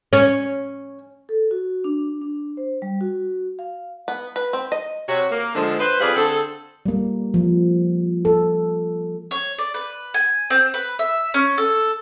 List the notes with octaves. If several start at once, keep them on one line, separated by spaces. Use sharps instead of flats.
C#4
A4
F#4
D4
D4
C5
G3
F#4
F5
B3
B4
C4
D#5
C3 F#4 C#5
A#3
D3 F3 G#3
B4 C5
F2 G3 G#4 B4 D5 F5
D3 C4 G#4 A4
G3 A#3
F3
A4
C#5
D5
B4
G#5
C4
B4
E5
C#4
A4